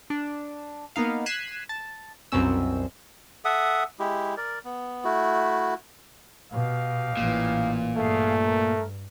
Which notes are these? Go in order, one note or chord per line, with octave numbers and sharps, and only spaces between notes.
D4
A#3 B3 D#4 F5
F#6 G#6 B6 C7 D#7 E7
A5
C2 F#2 B2 C4 C#4 E6
A4 E5 F#5 D#6
G#3 E4 G4
A#4 D5
B3
A3 E4 F#4
B2 G4 D#5 F5
A1 A#2 E3
G2 A3 G#4 F5
A#4